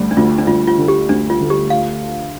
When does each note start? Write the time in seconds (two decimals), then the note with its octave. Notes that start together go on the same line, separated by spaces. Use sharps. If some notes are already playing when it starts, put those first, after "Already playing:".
Already playing: D2 G3
0.11 D4
0.17 D2 F4
0.38 D4
0.47 D2 F4
0.67 F4
0.78 D3
0.88 G4
1.09 D2 D4
1.30 F4
1.40 D3
1.50 G4
1.70 F4 F5